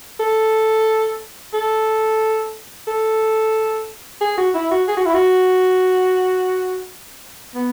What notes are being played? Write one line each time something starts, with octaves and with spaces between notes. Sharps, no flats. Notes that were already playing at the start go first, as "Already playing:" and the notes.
A4
A4
A4
G#4
F#4
E4
F#4
G#4
F#4
E4
F#4
B3